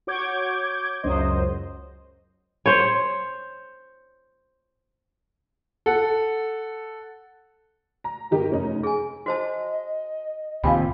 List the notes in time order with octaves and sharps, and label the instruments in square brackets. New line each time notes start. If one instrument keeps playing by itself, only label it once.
[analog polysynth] F#4 C#5 D6 G6 G#6
C#2 F#2 F#3 C5 D#5
[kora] C5 C#5
[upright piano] A4 F#5
[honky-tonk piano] A#5
G1 D#4 G4 A#4
F1 C#4 D#4
[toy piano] G#4 G#5
[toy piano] F#4 C5 A5 [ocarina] D#5
[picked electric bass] D1 D#2 C3 [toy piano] F4 G5 [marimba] F5 G#5 B5